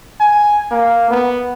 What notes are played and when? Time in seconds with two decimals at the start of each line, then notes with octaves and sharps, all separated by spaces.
0.20 G#5
0.71 A#3
1.10 B3